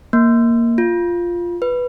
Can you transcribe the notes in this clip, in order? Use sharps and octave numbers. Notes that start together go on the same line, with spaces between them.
A#3
F4
B4